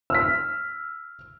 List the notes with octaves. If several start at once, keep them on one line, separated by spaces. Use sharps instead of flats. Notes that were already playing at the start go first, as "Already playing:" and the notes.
E6 F6 B6